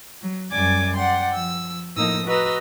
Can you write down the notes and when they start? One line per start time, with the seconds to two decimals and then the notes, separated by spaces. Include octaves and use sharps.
0.21 F#3
0.51 F#2 G3 D5 G#5 D6 G#6
0.96 D5 F#5 G5 C6
1.32 F3 E6
1.96 A2 F3 A#3 D#4 D#6 E6
2.26 F#4 B4 D#5 A#5 E6